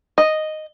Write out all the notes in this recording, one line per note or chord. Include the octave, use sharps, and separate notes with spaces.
D#5